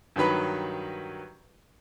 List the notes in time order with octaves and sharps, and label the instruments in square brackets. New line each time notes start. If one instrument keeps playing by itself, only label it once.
[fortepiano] G2 D#3 F#3 B4 B5